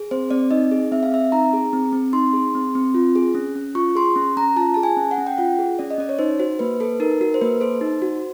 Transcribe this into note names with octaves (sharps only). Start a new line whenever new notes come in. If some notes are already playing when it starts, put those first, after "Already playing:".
Already playing: G#4
C4 C5
C4 D5
D#4 D#5
G#4
C4 E5
F5
C4 E5
D#4 A#5
G#4
C4
C4
D#4 C6
G#4
C4
C4
F4
G#4
C#4
C#4
F4 C#6
G#4 C6
C#4
C#4 A#5
F4 A5
G#4 A5
G#5
C#4
F#5
C#4
G5
F4 F#5
G#4
C#4 D5
D#5
C#4 D5
C#5
D#4 C5
F#4 C5
A#3 B4
A4 B4
D#4 A#4
F#4 A#4
C5
A#3 B4
A4 C5
D#4
F#4